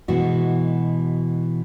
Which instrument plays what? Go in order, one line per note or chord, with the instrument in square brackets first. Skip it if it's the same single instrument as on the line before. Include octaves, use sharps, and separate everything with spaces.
[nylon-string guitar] B2 E3 G#3 F#4